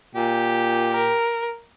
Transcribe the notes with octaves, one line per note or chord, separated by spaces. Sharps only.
A#2 G4
A#4